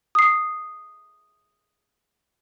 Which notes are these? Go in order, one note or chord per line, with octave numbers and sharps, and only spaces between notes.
D#6 C7